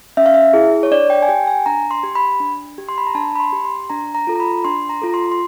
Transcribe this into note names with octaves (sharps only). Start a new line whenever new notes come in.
C#4 E5
F5
E5
E4 G#4
C#5
D4 D5
G5
G#5
G4 G5
G#5
D4 A#5
C6
G4
B5
D4
G4
C6
B5
A#5
D4 A5
B5
C6
G4
C6
D4 A#5
A#5
F4 A4
A#5
B5
D4 C6
A#5
F4 A4
C6
C6